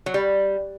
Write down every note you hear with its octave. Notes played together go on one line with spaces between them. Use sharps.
F#3
G3